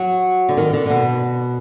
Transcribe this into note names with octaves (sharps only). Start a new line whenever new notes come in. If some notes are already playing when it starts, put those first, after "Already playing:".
Already playing: F#3
D3
D#3
D3
D3
B2